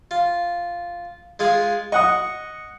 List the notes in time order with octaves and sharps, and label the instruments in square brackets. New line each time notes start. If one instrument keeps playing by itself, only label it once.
[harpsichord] F4
G#3 F4 G#4
[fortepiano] D#5 F#5 D#6 [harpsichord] C#6